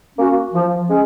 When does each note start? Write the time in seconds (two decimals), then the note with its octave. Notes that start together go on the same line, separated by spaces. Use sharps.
0.19 A#3 C#4 F#4
0.54 F3
0.89 G#3 C#4 G#4